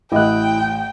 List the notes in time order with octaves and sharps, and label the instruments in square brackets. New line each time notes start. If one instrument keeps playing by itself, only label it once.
[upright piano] A1 D#5 [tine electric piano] E4 F#6 [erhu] G5